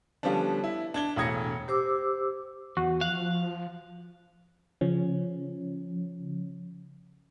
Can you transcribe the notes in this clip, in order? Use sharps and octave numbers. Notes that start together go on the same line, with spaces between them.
D3 F3 G3 B3 C#4 D4
E4
D4 G#6 G7
E1 A2 D#6 G#6 A#6 C#7
G4 C5 D6 E6
E2 F#4
F3 F5 F#6
C#3 F3 C#4